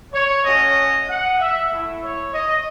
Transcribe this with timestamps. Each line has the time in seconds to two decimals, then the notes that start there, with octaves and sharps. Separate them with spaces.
0.13 C#5
0.44 A3 C#4 F#4 D#5
1.08 F#5
1.39 E5
1.70 A3 E4
2.02 C#5
2.33 D#5